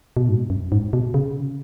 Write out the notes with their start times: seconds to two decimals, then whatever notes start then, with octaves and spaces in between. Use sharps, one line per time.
0.17 B2
0.29 G#2
0.50 F#2
0.72 G#2
0.93 B2
1.14 C#3